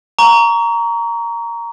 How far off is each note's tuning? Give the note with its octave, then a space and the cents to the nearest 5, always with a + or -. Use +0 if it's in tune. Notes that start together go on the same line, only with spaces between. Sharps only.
A#5 +0 C#6 +30